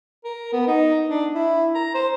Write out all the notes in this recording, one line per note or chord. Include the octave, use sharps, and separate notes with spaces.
A#4
B3
D#4
D4
E4
A#5
C5